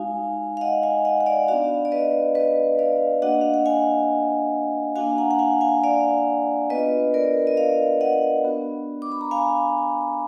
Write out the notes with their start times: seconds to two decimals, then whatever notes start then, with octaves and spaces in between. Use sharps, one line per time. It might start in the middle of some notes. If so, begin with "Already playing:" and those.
Already playing: G#3 D#4 F#4 F5 G#5
0.57 F5
0.61 D#5 F#5
0.83 F5 G#5
1.05 D#5 F#5
1.20 F#5
1.26 D5 F5
1.48 B3 D4 F#4 D5 F5
1.85 D5
1.92 B4 D#5
2.35 B4 D#5
2.79 D5 F5
3.22 A#3 D4 F#4 D#5 F#5
3.41 F5
3.54 F#5
3.66 F5 G#5
4.96 A#3 D4 F#4 F5 G#5
5.18 F#5 A#5
5.31 F#5
5.39 F5 G#5
5.61 F5 G#5
5.84 D5 F5
6.70 B3 D4 F4 B4 D#5
7.14 A#4 D5
7.47 D#5
7.57 D5 F5
8.01 D#5 F#5
8.44 B3 D4 F#4
9.02 D6
9.12 B5
9.21 A#5
9.31 F5 G#5